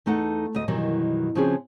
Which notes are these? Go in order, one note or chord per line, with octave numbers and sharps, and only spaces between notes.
E2 A3 D#4 A4 F#5
D2 D#5
F#2 B2 D#3 E3 F#3 G3
C#3 F3 C4 C#4 F#4 G#4